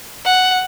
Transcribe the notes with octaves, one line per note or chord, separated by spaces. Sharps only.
F#5